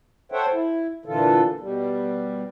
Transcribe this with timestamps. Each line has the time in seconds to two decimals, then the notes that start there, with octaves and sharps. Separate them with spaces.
0.32 A4 C5 C#5 E5 F#5 G5
0.52 E4
1.06 A#2 D3 E3 F4 A4
1.60 B2 G3